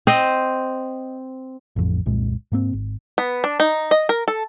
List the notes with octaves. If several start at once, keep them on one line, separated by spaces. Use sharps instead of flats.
C4 C5 D#5
A1 F2
F1 C2 A#2 G#3
G#2 A#3 C4
G#1
B3
D4
D#4
D#5
A#4
A4